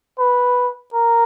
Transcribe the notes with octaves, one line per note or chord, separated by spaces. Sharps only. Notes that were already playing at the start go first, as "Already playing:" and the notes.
B4
A#4